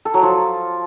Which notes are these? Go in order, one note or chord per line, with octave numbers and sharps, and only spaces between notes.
A4
F#3
F3